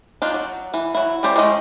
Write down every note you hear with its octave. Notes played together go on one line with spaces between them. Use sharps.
D4 D#4 F4
F#3
E3
F#3 E4
E3 C#4 G4 C5 D5
G#3 A3 C#4 E4 D#5